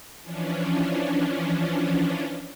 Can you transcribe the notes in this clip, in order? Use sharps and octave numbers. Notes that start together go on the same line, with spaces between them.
E3 F3 C#4 D4